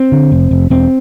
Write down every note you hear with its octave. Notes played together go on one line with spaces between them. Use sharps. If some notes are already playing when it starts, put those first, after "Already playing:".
Already playing: C4
D3
F1
F1
E1 C4